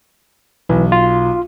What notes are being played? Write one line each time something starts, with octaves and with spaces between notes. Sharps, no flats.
B1 E3
F4